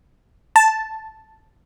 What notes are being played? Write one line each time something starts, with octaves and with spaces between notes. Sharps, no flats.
A5